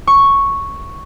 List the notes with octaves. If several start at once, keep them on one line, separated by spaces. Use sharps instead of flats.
C#6